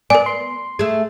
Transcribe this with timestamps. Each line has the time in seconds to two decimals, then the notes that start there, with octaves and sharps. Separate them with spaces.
0.10 B3 A#4 D5 G#5
0.26 C6
0.79 A3 G#4